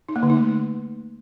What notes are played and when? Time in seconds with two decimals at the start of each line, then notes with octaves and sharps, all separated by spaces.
0.09 D#4
0.16 A#3
0.23 D3
0.30 D#4
0.37 A3